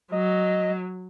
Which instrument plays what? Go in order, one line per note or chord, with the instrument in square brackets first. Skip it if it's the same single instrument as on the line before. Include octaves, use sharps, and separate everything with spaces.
[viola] F#3 [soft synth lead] D#5